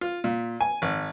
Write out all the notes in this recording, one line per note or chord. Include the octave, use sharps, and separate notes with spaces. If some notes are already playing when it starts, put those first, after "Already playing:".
F4
A#2
G#5
G#1